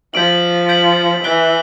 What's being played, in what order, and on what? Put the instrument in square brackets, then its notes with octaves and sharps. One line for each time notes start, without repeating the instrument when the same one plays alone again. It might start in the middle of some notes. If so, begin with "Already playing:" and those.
[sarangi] F3 [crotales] G6 B6 D7 F#7
[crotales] G6 B6 D7 F#7
[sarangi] E3 [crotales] F#6 B6 D7 G7